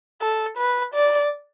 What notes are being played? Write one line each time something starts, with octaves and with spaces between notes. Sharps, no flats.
A4
B4
D5